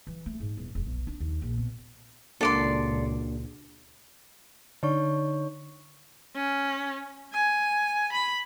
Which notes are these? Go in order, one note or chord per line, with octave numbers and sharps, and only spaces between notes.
E3
A3
G#2
E1
E1
B1
D4
D#2
A#1
B2
C#2 A#2 A#3 D4 F#4 A4 D5 C6
D3 D#4 C#5 C#6
C#4
G#5
B5